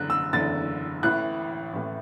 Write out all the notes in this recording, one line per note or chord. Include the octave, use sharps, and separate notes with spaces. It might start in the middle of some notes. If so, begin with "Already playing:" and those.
Already playing: F#1 E2 D3 F#6
E6
F#1 E2 D3 A6
A1 A2 E3 F#6
A1 A2 E3